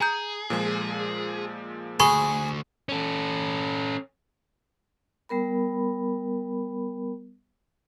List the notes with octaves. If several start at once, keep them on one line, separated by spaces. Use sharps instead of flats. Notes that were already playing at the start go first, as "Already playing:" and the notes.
G#4 G#5 A#5 G6
A#2 F3 G#3
D2 G#4 B5 C#6
C#4 A4
G3 B3 A#4 B5